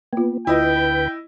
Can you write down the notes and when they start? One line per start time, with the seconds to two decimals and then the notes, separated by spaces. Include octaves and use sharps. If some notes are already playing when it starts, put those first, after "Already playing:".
0.13 A#3 B3 F4
0.47 D2 E4 F4 B4 D#5 G5